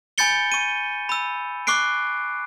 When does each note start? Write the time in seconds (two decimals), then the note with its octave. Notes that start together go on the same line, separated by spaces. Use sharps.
0.18 G#5 B5 G6 A6 C#7 G7
0.52 C#6 D#7
1.09 B5 E6
1.67 C#6 D6 F#6 C7 D7